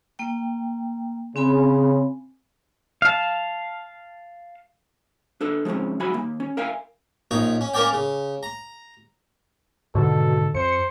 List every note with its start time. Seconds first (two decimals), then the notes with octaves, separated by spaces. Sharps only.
0.19 A#3 G5
1.36 C#3 C4 G#5 B5
3.02 F5 A5
5.41 D4 A4 B4
5.65 F3 G#3 A3 C4 C#4
6.00 G#2 F#3 F#4 E5 G#5 B5
6.14 D#2 A#3
6.40 C#4
6.57 A#4 E5 F5 G5 G#5
7.31 A#1 D#4 C#5
7.61 C#4
7.74 A#3 C#4 A#4 C#5 D5 G5
7.93 C#3
8.43 A#5
9.95 G#2 B2 D3 D#3 A4
10.55 F2 C5 C#7